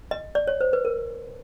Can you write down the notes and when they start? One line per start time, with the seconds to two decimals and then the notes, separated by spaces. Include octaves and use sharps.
0.11 D#5
0.35 D5
0.47 C#5
0.61 C5
0.73 B4
0.85 A#4